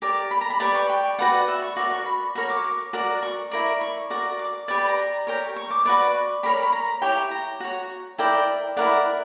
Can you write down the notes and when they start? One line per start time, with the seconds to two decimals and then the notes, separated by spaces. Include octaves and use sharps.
0.02 G4 A#4 D5 D6
0.31 B5
0.41 A#5
0.50 B5
0.60 G4 B4 D5 C#6
0.75 C#6
0.89 G5
1.19 F#4 B4 D5 F#5
1.48 E5
1.62 C#6
1.76 F#4 A#4 D5 D6
1.91 C#6
2.06 B5
2.35 F#4 A#4 C#5 C#6
2.50 D6
2.64 D6
2.93 F#4 A#4 D5
3.23 C#6
3.51 E4 A#4 D5
3.81 C#6
4.10 F#4 A#4 D5
4.39 D6
4.68 G4 B4 D5 C#6
4.78 B5
4.88 A#5
4.98 A#5
5.27 G4 A#4 C#5
5.56 C#6
5.70 D6
5.85 F#4 B4 D5 C#6
6.43 G4 A#4 C#5 B5
6.63 B5
6.73 A#5
7.02 E4 G4 C#5 G5
7.31 A#5
7.60 F#4 C#5
8.18 E4 A#4 D5 G5
8.77 E4 A#4 D5 F#5